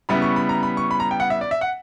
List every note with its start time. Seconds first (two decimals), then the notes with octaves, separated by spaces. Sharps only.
0.09 C#3 G3 B3 E4 B5
0.22 C#6
0.36 B5
0.49 A#5
0.63 B5
0.77 C#6
0.91 B5
1.00 A#5
1.11 G5
1.20 F#5
1.30 E5
1.41 D5
1.51 E5
1.61 F#5